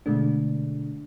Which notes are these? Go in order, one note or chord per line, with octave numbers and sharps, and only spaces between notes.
B2 D3 G#3 A3 D4